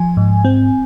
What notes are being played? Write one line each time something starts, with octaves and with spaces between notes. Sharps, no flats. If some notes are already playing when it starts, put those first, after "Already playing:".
Already playing: F3 G#5
G#2
C4